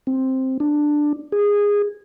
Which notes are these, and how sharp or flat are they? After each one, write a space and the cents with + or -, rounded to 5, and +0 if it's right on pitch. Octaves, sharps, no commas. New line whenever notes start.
C4 +5
D4 +10
G#4 -15